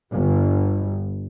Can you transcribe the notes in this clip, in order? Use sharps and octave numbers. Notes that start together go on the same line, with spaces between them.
G1